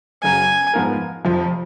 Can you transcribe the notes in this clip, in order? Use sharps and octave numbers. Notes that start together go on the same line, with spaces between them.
F#2 C#3 F#3 G#5
G#2 F3 B3 F4 A#4
F1 F2 F3